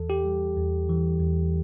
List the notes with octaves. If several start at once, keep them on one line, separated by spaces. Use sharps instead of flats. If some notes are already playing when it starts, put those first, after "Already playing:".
Already playing: E2 E3 A4
G4
G3
E2
E3
E2